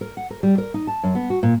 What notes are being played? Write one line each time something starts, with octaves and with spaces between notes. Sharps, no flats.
A#4
F#5
A#4
G3
A#4
D#4
A5
F#2
B3
F#4
A#2